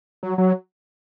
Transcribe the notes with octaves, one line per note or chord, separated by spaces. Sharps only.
F#3
F#3